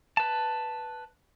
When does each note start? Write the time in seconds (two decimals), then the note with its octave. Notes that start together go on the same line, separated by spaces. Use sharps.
0.17 B4 A5